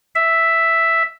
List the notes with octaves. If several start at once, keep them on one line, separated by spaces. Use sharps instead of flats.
E5